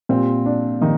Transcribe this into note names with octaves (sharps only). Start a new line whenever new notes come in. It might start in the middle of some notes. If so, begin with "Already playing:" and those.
A#2 G3 C4
D4
A#2 D#3 D#4